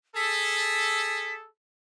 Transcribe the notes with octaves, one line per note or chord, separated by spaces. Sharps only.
G#4 A4 B6